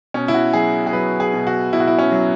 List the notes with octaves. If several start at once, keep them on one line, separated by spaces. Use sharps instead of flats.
B2 C#4
E4
F#4
F#3 G#4
G#4
F#3 B4
G#4
B2
F#4
B2 E4
F#4
E4
C#4
F#3